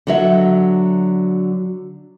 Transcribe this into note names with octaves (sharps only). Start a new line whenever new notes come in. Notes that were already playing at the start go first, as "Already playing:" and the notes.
D3 F#3 E5